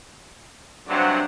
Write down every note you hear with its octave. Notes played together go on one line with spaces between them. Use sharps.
G2 C3 F#3 D4 C5 F#5